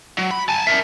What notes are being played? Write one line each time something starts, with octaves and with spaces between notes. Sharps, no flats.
F#3
B5
G#5 A5
A#4 E5